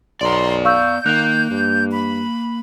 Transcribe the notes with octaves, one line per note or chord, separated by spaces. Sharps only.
B1 B3 D5 A#5 C6
F5 C#6 E6 G6
D#3 A#3 F5 F#6 F7
G2
B5